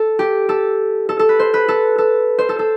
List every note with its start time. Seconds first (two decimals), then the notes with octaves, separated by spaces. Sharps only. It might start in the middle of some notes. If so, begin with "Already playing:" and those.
Already playing: A4
0.19 G4
0.49 A4
1.09 A4
1.19 A4
1.29 B4
1.39 C5
1.54 B4
1.68 A4
1.98 A4
2.39 C5
2.49 A4
2.59 A4